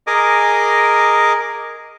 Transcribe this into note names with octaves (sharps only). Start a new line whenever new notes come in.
G#4 A#4 D#5 G#5 D6